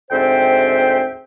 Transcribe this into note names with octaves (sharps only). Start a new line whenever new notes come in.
D2 G#2 C4 C5 E5 G5